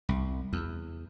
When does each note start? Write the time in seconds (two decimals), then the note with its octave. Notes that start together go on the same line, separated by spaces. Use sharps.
0.09 C2
0.53 E2